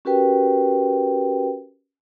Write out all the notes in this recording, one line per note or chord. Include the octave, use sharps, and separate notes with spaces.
C#4 F#4 G4 A#4 B4 G5